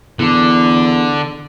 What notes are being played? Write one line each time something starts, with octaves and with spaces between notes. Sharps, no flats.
E2 D3